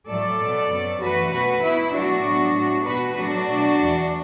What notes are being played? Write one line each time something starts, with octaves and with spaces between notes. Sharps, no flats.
A2 F#3 A3 A4 D5
B2 B3
F#2 F#3 B3
F#2 E3 A3 F#4 B4
B2 A3 F#4 B4
B2 B3 E4
B2 F#3 A3 D4 F#4
A2 F#3 B3
A2 A3
B2 B3 F#4 B4
A2 F#3 A3 D4 F#4
B2 F#3 A3
E2 E3 A3